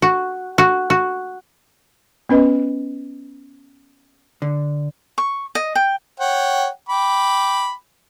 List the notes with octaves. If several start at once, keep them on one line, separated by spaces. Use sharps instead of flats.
F#4
F#4
F#4
B3 C#4 B4 D#5
D3
C#6
D#5
G5
C#5 F#5 G5
G5 B5 D6